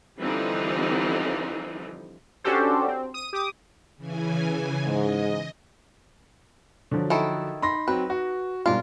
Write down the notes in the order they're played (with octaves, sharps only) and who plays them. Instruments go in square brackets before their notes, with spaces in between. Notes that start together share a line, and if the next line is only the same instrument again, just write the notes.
[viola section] D3 E3 F3 G3 C4 D#4
[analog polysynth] C#4 D4 F#4 G4 A4 C5
C4
D#6 D#7
G4 D6 D#6
[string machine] C#3 E3 G#5
[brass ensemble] G#2 [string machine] D#5
[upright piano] D3 F3 F#3
[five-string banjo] D#3 E4 A4
[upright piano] D#4 [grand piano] B5 C6 A#6
[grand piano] F#3 C4 [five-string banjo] B4
[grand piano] F#4
[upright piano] G#2 B2 G3 [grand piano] D4 [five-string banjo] F4 A#4